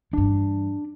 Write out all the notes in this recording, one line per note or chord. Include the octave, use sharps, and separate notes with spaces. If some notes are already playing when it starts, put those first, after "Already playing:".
G2 E3 D4